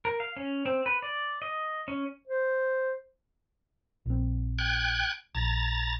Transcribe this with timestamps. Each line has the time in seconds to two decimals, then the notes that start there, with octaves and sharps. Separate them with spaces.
0.05 A#4
0.20 F5
0.37 C#4
0.66 C4
0.86 B4
1.02 D5
1.42 D#5
1.88 C#4
2.27 C5
4.06 A#1 C4
4.59 G5 F#6 G#6
5.35 A#1 A#5 A6